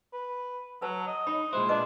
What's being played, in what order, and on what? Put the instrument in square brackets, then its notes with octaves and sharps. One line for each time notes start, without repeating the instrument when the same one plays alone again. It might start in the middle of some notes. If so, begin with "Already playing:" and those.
[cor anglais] B4
[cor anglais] F#3 [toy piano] B4 A5
[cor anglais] D#5
[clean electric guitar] D#4 [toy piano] C#5 B5
[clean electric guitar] A#2 G#3 E4 [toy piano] C5 [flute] C6
[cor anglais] D4 [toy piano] B4 D#5 D6